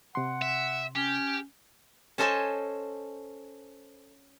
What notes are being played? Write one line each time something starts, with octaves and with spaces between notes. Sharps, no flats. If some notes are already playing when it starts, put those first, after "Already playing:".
C3 F#5 C6
E5
C#4 G4
C#4 A4 C5 D#5 G#5 A5